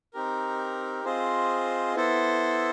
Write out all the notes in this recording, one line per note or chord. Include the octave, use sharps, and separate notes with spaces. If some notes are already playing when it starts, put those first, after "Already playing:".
C4 D#4 G4 A#4
C4 F4 G#4 C5 D#5
B3 E4 A4 C5